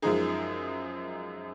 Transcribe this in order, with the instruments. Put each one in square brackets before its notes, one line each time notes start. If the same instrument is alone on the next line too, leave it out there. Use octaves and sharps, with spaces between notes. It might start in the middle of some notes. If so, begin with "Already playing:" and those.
[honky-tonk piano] F#2 F3 G#3 D#4 G#4